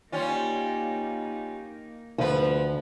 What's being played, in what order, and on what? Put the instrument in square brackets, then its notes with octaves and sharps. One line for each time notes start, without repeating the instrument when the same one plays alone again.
[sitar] G3 C#4 F4 [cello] A#3 D#4
[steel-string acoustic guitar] D2 [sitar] F3 B4